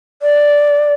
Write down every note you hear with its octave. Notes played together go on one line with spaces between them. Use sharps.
D5